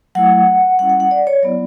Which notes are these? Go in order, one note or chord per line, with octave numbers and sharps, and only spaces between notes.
F#3 A3 E4 F#5
G3 C#4 E4 F#5
F#5
F#5
D5
C#5
F#3 B3 E4 D5